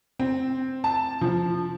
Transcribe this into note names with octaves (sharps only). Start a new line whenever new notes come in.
C4
A5
F3